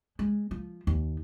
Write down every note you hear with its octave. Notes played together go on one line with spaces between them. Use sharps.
G#3
F3
D#2